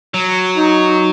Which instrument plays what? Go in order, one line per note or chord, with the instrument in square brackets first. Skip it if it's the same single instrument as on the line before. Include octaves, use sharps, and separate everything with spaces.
[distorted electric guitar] F#3
[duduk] D#4